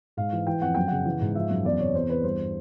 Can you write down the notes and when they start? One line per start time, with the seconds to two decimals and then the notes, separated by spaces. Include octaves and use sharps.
0.17 G#2 F5
0.33 E3
0.47 E3 G5
0.62 F2 F#5
0.75 F#2 G5
0.88 C#3 F#5
1.06 E3
1.21 G#2
1.35 F3 E5
1.50 F#2
1.64 E2 D5
1.80 C3 C#5
1.95 E2 C5
2.09 E2 B4
2.24 G2 C5